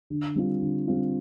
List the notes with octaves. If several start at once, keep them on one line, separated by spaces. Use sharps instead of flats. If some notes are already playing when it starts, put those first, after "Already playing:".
D3
G3 C4 F4
D3
G3 C4 F4